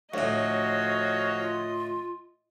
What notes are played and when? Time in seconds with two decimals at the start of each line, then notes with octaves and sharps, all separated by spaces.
0.14 D2 A2 F3 F#4 C#5 D#5
1.39 F4